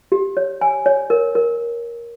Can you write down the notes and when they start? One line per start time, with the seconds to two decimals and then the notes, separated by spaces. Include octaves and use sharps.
0.12 G4
0.37 C#5
0.61 G#5
0.86 C#5
1.10 A#4
1.35 A#4